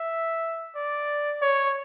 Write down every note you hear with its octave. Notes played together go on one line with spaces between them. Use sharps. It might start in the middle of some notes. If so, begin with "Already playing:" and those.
Already playing: E5
D5
C#5